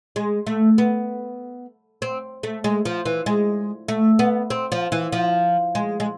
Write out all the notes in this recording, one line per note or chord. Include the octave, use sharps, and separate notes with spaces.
G#3
A3
B3
C4
A3
G#3
F3
E3
G#3
A3
B3
C4
F3
E3
F3
G#3
G#3